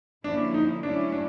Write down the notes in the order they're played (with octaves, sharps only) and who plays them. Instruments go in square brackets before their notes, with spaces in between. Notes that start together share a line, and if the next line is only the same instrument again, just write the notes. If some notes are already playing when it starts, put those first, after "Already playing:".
[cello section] D3 F3 A#3 C#4 E4 [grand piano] D4
[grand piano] D#4
[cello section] F#3 A3 C#4 E4 [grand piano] D4
[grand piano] D4